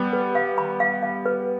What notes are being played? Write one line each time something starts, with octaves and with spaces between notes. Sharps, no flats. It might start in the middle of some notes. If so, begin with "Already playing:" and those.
Already playing: G3 B3
B4
F5
B5
F5
F5
B4